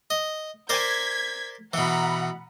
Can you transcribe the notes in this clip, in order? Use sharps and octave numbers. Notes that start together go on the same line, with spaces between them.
D#5
A#4 C5 D5 G#6 B6
B2 E3 F#5 A#5 B5